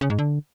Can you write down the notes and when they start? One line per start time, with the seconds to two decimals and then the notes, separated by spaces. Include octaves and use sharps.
0.01 C#3
0.10 G#2
0.18 D3